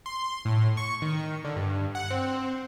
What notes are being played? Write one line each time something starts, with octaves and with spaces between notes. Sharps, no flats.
C6
A2
C#6
D#3
D3
G2
F#5
C4